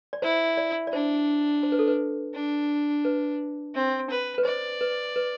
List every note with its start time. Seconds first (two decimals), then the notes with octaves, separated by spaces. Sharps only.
0.13 D5
0.22 E4 C5
0.57 D5
0.87 D5
0.93 D4 C5
1.63 C5
1.72 B4
1.79 A4
1.88 B4
2.34 D4
3.05 B4
3.75 C4
4.10 B4
4.38 B4
4.45 C5 D5
4.81 B4
5.16 B4